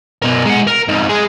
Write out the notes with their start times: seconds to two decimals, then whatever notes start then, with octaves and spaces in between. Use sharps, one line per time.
0.22 B2 A#4
0.46 G#3 F#5
0.67 A#4
0.88 F2 G#2
1.09 G#3 G#4